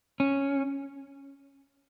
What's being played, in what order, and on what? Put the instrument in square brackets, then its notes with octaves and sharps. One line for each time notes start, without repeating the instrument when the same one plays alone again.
[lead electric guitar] C#4